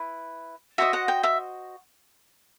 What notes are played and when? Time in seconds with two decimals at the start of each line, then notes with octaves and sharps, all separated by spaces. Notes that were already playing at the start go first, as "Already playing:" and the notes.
Already playing: E4 B4
0.78 F#4 C5 D#5 E5
0.93 F#5
1.08 G5
1.23 E5